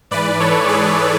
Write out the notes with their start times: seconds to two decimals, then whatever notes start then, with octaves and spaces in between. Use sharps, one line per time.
0.11 G#2 E3 B4 D5
0.40 A4 C#5
0.68 G#4 B4